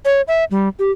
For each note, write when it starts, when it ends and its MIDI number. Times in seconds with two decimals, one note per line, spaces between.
0.05 0.21 73
0.28 0.44 76
0.51 0.68 55
0.79 0.91 67